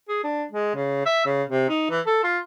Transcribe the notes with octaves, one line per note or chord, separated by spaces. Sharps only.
G#4
D4
G#3
C#3
E5
C#3
C3
D#4
E3
A4
F4